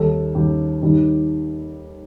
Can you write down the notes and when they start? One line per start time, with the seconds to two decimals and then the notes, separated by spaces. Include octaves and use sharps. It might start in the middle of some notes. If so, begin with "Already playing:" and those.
Already playing: D#2 D#3 G3 A4
0.35 D#2 D#3 G3 G4
0.82 D#2 D#3 G3